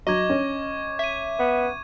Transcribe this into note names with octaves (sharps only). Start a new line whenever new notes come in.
F#3 D#5 C#6 D6 G#6
C#4
E5 G#6 D#7
B3